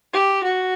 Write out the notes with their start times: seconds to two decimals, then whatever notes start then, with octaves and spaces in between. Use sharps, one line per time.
0.13 G4
0.43 F#4